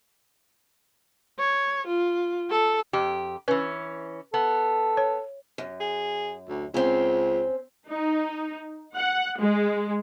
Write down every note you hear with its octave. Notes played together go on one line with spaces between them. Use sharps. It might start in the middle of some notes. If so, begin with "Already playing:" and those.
C#5
F4
A4
F2 G4
E3 C#4 B4
B3 A4
C#5
F#2
G#4
D2
C#2 C4 C#4
D#4
F#5
G#3